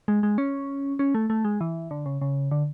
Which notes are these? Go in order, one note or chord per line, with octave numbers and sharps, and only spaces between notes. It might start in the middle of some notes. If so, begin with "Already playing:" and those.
G#3
G#3
C#4
C#4
A3
A3
G#3
E3
D3
C#3
C#3
D3